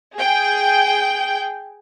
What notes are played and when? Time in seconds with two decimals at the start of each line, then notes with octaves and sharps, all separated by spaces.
0.16 G#4 G5